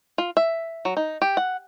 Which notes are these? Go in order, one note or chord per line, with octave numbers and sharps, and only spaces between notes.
F4
E5
F#3
D#4
G4
F#5